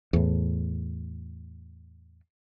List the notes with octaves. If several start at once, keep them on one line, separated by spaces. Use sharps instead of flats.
E2 A2